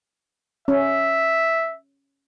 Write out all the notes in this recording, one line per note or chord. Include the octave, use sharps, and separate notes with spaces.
C#4 E5